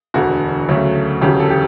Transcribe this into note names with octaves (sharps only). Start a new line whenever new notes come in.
E1 D2 D3 F#4
D2 C#3 F#3 A3
E1 D2 C#3 F#3 G4
A4
G4